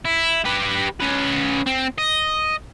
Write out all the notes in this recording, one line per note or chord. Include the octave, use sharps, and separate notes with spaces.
E4
G4 B4
C#4 B4
C4
D#5